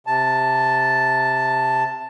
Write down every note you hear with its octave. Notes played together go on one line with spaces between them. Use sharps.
C3 A5